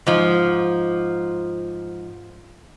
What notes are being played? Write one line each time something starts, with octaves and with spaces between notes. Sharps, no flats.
G#2 F3